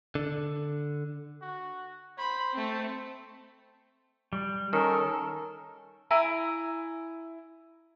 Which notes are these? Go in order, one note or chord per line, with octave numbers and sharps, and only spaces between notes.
D3
F#4
C5 B5
A3 C4
G3
D#3 C#4 A4 A#4
E4 G#5 A#5